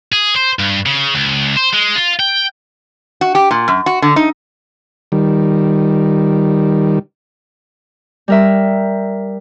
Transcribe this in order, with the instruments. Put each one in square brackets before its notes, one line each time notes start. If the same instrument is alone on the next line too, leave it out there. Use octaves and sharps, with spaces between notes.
[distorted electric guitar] G#4
C5
G2
C#3
C#2
C5
G#3
F4
G5
[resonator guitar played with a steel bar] F#4
G4
A#2
F#2
F#4
D3
D#4
[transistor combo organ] D#3 G3
[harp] G3 A#4 E5